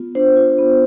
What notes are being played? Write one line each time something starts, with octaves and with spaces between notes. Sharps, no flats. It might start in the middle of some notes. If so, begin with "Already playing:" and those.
Already playing: B3 F4
D4 C5
F4
B3